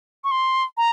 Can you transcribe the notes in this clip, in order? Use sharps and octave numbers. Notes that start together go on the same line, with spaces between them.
C#6
C6
A#5